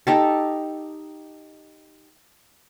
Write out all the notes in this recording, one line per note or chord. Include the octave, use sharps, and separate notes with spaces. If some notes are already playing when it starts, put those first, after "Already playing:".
D#4 G4 A4